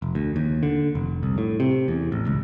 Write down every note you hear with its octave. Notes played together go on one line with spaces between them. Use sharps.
F1
D2
D#2
D3
F1
C2
A2
C3
E2
A1
C#2